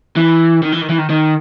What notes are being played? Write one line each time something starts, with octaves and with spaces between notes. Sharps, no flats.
E3
D#3
E3
D#3
E3
D#3
D#3